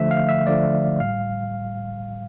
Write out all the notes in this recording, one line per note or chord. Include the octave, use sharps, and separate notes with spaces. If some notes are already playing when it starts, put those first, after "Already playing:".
Already playing: D3 F3 A3 E5
F5
E5
D3 F3 A3 D5
A2 G3 F5